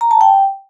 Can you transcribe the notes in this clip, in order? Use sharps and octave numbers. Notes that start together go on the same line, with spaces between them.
A#5
A5
G5